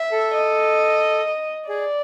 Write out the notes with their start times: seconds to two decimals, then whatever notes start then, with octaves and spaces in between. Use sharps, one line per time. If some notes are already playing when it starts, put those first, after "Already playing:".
Already playing: E5
0.12 A4
0.34 D#5
1.69 G#4 D5